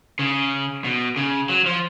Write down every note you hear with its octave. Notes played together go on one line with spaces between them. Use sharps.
C#3
B2
C#3
F#3
F3